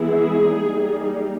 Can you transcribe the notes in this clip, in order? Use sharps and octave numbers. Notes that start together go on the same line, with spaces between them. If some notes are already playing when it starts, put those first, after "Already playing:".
Already playing: E3 G#3 B3 E4 G#4
G3 A#3 D#4